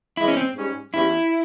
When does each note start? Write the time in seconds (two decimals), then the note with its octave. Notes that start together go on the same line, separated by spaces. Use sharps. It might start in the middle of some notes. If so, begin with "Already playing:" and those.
0.17 G#2 E3 G#3 E4
0.28 C#4
0.37 C4
0.55 G#2 G3 C#4
0.93 E2 E3 G3 C#4 E4 G4